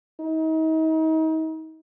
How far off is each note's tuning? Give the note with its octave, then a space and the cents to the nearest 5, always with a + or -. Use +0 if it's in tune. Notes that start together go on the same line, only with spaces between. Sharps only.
D#4 +35